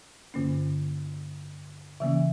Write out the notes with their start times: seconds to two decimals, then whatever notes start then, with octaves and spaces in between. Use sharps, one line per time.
0.34 G2 D3 A#3 C#4
2.00 C#3 E3 A#3 C#4 E5